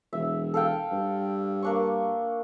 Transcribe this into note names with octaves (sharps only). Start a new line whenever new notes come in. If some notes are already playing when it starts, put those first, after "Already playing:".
E1 E5
A4 F5 G5
G2
A#3 D4 C#6